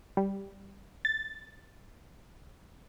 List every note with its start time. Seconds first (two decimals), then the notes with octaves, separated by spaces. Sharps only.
0.17 G3
1.05 A6